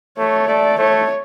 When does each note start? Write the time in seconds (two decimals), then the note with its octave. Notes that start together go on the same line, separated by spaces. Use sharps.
0.18 A3 C#5
0.48 A3 D5
0.78 A3 C#5